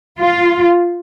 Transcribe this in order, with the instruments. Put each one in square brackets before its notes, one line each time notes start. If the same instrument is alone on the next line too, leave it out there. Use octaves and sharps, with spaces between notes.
[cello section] F4